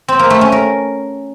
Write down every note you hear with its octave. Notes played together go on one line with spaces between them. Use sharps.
C4
A#3
A3
C#4
A#4